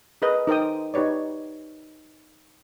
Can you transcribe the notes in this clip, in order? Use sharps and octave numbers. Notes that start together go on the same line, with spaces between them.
G#4 A#4 B4 D#5
D#4 A#4 C5 G5 D#6
D#4 G4 B4 C#5 D5